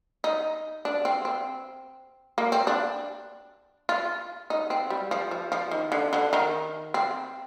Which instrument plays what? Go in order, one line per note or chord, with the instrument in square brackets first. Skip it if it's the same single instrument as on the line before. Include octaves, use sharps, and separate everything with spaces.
[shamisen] D#4
D4
C4
C4
A#3
C4
D4
F4
D#4
C4
G3
F3
F3
F3
D#3
D3
D3
D#3
C4